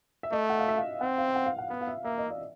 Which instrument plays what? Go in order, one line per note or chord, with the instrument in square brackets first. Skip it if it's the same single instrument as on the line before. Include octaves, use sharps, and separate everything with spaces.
[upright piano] E5
[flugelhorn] A3 [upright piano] D#5
[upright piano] F#5
F5
E5
F5
[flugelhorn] C4 [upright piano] F#5
[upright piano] F5
F#5
F5
F#5
[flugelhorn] B3 [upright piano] F5
[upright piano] F5
E5
[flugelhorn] A#3 [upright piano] E5
[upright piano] D#5
D5